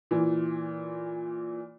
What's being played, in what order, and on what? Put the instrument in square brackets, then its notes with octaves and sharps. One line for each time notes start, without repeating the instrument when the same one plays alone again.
[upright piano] A#2 E3